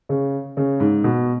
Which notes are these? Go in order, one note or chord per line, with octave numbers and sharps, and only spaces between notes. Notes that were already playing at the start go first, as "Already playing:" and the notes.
C#3
C#3
G#2
B2